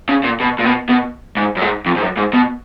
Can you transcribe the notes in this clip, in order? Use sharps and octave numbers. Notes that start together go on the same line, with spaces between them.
C#3
A#2
B2
A#2
B2
B2
G#2
F#2
G#2
F2
G#2
F#2
G#2
B2